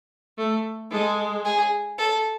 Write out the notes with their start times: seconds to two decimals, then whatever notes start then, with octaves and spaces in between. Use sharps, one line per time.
0.38 A3
0.90 G#3 A4
1.45 G#4
1.98 A4